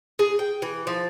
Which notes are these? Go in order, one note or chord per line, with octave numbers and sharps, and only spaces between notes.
G#4
G5
E3
F3